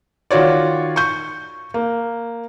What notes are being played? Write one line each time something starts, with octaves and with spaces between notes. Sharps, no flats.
D#3 F4 F#4 C#5 D5
C#6 G6
A#3